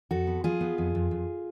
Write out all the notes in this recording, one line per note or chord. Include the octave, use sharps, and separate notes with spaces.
F2 F#4 A4
B3
F3 F4 G#4
B3
F2
F2
F2